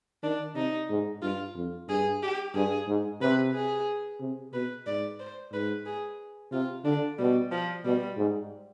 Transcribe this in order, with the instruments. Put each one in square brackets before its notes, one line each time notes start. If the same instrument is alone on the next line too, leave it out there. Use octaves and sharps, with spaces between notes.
[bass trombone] D#3 [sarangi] D4
[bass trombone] C3 [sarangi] D#4
[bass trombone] G#2
[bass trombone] G2 [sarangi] F4
[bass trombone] F2
[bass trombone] G2 [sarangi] G#4
[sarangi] G4
[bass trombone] G2 [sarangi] G#4
[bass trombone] G#2
[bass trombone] C3 [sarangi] B4
[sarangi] G#4
[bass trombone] C3
[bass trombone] B2 [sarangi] B4
[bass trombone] G#2 [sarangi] D5
[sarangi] C5
[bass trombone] G#2 [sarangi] B4
[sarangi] G#4
[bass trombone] C3 [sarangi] F4
[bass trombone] D3 [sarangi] D4
[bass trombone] B2 [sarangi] G3
[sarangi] F3
[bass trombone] B2 [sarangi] G3
[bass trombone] G#2